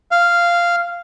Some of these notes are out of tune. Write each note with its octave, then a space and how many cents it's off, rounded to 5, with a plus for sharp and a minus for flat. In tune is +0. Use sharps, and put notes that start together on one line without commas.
F5 -10